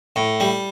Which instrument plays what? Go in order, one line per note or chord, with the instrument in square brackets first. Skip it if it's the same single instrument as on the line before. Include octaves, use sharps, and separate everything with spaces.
[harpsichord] A2
G3